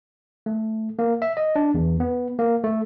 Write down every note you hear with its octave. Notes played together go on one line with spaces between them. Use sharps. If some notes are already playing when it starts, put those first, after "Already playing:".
A3
A#3
E5
D#5
D4
E2
B3
A#3
A3